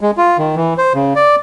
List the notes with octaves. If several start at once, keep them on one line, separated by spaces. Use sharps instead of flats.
G#3
F4
D#3
E3
C5
C#3
D5